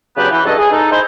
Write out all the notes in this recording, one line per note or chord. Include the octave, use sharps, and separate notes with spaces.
C#3 F#3 B3 D4 G4 B4
E3
C#2 G2 F#3 A4 D#5 A5
G#4
D#4 A4
D#4 E4 C5